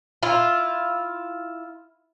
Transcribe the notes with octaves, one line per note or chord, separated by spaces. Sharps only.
E4 F4